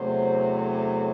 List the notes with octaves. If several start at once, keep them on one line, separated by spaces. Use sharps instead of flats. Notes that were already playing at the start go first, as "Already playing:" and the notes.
Already playing: E2 C3 F#3 A3 C5
C#5